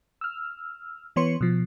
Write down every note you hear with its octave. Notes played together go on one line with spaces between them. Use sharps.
E6 F6
E3 B3 C#5 C6 C#7
B2 F3